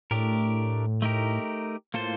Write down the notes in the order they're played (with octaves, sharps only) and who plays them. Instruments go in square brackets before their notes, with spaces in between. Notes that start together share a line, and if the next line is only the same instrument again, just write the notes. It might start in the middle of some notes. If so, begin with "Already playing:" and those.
[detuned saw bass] A2 [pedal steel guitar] A3 D4 G4 A#4
[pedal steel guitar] A3 D#4 G4 A#4
[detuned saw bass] A2 [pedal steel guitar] A#3 F4 A4 C5